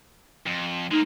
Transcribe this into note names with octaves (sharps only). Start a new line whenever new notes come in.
F2
G#3 A#3 D#4